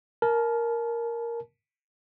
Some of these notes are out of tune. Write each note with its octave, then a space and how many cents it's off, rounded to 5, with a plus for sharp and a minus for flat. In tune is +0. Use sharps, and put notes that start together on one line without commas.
A#4 +0 A5 -35